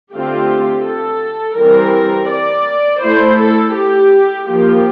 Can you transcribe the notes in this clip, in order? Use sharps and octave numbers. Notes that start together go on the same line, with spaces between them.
D3 A3 C4 F4 G4
A4
E3 G3 C4 A#4
D5
A3 E4 C5
A4
G4
F3 A#3 F4 G4